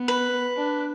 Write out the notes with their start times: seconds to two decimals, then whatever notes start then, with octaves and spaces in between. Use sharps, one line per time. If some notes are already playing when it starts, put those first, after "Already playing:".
Already playing: B3
0.08 B4
0.57 D4